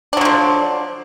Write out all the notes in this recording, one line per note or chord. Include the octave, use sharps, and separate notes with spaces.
D3 F3 F#3 D4